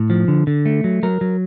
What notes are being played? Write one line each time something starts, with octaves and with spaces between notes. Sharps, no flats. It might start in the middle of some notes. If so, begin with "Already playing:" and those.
Already playing: A2
F3
D3
D3
A3
F#3
F#3 A#4
F#3